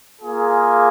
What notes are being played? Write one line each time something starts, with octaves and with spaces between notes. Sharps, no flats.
A#3 F4 G#4